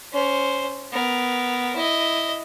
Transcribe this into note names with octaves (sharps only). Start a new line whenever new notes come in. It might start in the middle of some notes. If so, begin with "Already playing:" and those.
C#4 C5
B3 A#4
E4 D#5